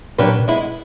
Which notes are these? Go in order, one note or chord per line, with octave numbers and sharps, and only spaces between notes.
A#2 F#3 A#3 D4 G4 B4
G#3 B3 E4